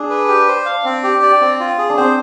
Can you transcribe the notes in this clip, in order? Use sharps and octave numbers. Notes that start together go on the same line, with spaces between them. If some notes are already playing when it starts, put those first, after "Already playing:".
Already playing: D4 G#4
B4
G4
C5
F5
C4
G4
D5
C4
F4
G#4
D4
C4 C5